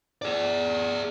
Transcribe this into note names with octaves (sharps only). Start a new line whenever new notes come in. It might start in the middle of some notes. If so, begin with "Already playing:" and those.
G#4 D5